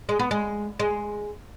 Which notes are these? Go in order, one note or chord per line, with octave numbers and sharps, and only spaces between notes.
G#3
B3
G#3
G#3